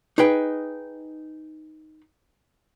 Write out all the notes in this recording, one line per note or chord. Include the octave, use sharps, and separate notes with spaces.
D#4 G#4 B4 G5